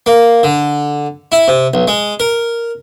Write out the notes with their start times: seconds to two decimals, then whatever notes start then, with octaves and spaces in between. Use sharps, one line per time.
0.06 A#3
0.43 D3
1.32 E4
1.48 C3
1.74 B1
1.88 G#3
2.20 A#4